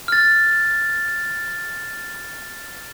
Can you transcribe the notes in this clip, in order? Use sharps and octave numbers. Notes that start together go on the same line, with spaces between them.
F6 A6